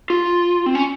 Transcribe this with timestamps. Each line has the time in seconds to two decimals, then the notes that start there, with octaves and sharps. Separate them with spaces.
0.10 F4
0.66 C4
0.75 C#4